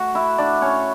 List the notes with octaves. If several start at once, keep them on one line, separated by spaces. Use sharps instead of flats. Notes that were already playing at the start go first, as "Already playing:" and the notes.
Already playing: A3 F#4 F#5
E4 E5
D4 D5
C#4 C#5